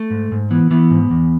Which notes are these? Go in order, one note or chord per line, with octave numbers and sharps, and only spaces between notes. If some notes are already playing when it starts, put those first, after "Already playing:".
Already playing: A3
G#2
G#2
E3 B3
E3 B3
G#2
E2